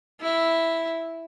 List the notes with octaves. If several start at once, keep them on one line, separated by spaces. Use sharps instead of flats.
E4